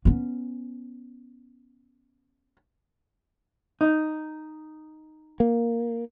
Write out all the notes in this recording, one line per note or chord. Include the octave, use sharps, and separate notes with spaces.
B3 C#4
D#4
A#3